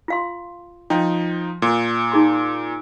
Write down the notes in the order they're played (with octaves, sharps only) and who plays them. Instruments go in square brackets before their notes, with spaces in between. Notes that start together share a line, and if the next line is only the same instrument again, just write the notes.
[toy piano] F4 F5 C6
[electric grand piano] F3 D#4 [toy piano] G5
[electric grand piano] A#2
[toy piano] D#4 G#4 C6